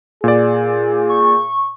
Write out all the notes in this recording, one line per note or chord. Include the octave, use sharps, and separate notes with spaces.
A#2 G#4 D5
C#6